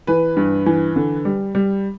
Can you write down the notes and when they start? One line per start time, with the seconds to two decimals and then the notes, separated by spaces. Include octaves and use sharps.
0.07 E3 B4
0.37 G2
0.66 E3
0.96 D3
1.25 G3
1.55 G3